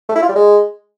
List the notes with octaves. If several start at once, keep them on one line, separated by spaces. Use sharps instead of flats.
A3
E4
F4
G3
G#3